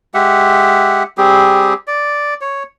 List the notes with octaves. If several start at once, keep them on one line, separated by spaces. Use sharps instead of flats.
G#3 G4 E5 F#5
G3 C4 G4 G#4
D5
C#5